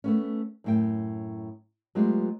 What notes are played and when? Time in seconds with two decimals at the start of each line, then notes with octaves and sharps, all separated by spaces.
0.04 A3 B3 C#4
0.64 F#2 A2 G5
1.95 F#3 G#3 A3 B3 F4 G4